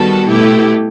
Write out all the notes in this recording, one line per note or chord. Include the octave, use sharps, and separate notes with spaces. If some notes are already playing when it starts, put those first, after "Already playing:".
Already playing: D#3 G3 B3 F#4 A4
B2 A3 E4 G4